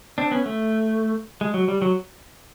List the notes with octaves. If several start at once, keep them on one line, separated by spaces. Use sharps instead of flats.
C4 D4
B3 C#4
A3
G#3
F#3
G3
F#3